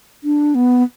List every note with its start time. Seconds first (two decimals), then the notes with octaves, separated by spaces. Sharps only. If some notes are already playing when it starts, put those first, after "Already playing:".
0.24 D4
0.55 B3